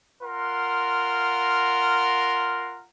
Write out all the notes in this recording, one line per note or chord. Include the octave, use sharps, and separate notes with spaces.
F4 A#4 F#5 C6